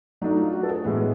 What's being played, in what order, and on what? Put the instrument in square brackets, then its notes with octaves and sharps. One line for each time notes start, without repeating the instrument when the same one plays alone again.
[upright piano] F#3 A3 D4 [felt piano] D#4
[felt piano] F4
F#4
A4
G#4
[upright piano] A2 E3 G#3 B3 [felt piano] E4